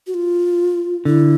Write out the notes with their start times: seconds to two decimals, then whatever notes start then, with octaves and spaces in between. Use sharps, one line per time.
0.07 F#4
0.14 F4
1.05 D3 E4